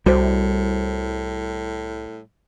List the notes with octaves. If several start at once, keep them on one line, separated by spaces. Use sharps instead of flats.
C2 A2 G3 F#4 C5